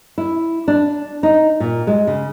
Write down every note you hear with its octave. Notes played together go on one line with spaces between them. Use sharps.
E4
D4
D#4
A#2
G#3
C#3